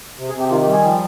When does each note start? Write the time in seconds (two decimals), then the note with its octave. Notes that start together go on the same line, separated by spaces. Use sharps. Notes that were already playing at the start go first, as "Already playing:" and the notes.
0.18 C3
0.29 G#4
0.34 C3
0.39 G4
0.50 D#3 F4
0.62 G4
0.67 G3
0.73 G#4
0.83 F3